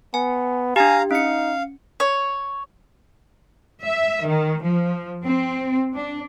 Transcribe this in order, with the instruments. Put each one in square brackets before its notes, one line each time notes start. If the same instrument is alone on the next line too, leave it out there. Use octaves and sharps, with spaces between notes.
[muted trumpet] B3 [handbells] G#5
[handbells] D4 G4 [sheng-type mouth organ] F5 A#5 [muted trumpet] G#5
[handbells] C#4 C#7 [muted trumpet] D#4 [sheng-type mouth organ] F5
[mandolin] C#5
[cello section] E5
D#3
F3
C4
D4